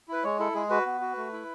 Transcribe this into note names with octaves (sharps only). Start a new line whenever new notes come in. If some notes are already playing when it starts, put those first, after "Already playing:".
E4 B4
G#3 C#5
E4 A4
G#3 G#4
F#4 B4
B3
F#4
A3
E4